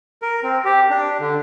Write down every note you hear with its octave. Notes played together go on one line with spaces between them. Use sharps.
A#4
C4
G4
D4
D3